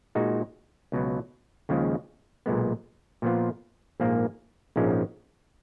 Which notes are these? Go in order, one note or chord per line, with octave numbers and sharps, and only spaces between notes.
A#2 G#3 D#4 F#4
C#2 B2 F#3
D#2 C#3 F3 G#3
B1 A#2 G#3 B3
A#2 F3 B3 F4
A#1 G#2 F3 A#3
A#1 G#2 F3 G#3 C#4